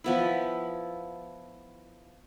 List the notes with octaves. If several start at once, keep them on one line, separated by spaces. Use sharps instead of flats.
F3 B3 E4